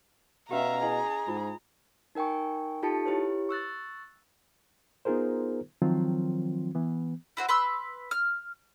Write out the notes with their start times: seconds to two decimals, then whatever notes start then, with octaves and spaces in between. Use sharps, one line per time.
0.51 B2 C#4 G4 E5 F5 A#5
0.82 E4 G#4 D#5 G#5
1.28 G#2 F4
2.15 D#4 A#4 G5 G#5 C#6
2.82 D#4 F4 G4 A4 A5 C#7
3.06 E4 G4 B4 C#5
3.49 C#6 E6 F#6 A6
5.05 B3 D#4 F4 G#4 A#4 C5
5.82 D#3 F3 F#3 C4 F4
6.75 E3 B3
7.37 E4 F#4 C5
7.49 B4 C6 E6
8.11 F6